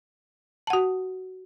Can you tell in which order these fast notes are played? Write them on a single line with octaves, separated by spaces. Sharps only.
A5 F#5 F#4